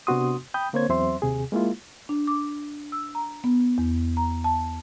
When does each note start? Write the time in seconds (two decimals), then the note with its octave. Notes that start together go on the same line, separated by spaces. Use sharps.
0.07 C3 B3 D4 F#4 C6 D#6
0.54 G5 B5 D#6 G6
0.73 D3 A#3 C4 C5 C#5 G#6
0.89 E2 F#3 C4 C5 E5 C6
1.22 D#2 C3 G#4
1.52 G#3 A#3 E4 F4
2.09 D4
2.27 D6
2.92 E6
3.15 A#5
3.44 B3
3.78 E2
4.17 A#5
4.44 A5